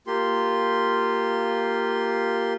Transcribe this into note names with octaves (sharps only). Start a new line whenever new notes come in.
A#3 F4 G4 C6